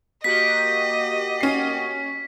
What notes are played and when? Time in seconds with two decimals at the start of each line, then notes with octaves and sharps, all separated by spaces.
0.24 A#3 F#4 G4 D#5 B6
1.41 C#4 C7